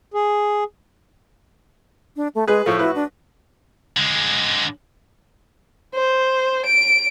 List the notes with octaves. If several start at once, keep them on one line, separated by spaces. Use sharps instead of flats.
G#4
D4
A3
G#3 G#4 B4
A2 F3 A3 C#6
E4 F#4 B4
D4
D3 G#3
C5
D7